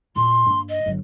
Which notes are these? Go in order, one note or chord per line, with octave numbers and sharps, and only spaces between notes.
E2 A#2 C6
G2 A#3
D#5
G1 F#3